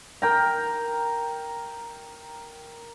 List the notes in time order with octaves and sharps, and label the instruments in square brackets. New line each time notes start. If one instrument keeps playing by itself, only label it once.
[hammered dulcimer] A#4 G5 A#5